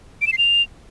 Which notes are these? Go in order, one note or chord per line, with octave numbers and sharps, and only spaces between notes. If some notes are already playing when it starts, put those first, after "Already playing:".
D7
E7
C7
F7